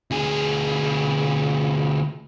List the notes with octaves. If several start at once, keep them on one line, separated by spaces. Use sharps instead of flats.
D2 G#4